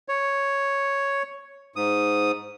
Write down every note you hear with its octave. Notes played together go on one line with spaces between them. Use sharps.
C#5
G#2 D#6